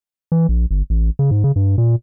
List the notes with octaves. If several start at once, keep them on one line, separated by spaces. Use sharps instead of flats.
E3
A#1
G1
A1
C#3
G#2
C#3
G2
A#2